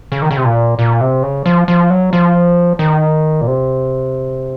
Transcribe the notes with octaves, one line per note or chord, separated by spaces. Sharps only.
C#3
D#3
C#3
C3
A#2
A#2
C3
C#3
F3
F3
F#3
F3
D#3
A#2
C3